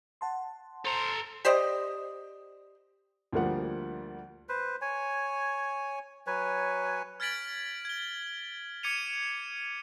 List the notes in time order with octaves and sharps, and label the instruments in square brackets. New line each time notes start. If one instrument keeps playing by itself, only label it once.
[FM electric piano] F#5 A5 C6
[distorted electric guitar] A4 A#5 [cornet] C5
[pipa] G4 C5 D5 D#5
[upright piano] D2 F3 G3 A#3 F#5
[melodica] B4 C5
C#5 G#5
F#3 B4 C#5 G#5
[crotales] F6 G#6 A6 B6 D7 F#7
G#6 G7
D6 G#6 C#7 D#7 F7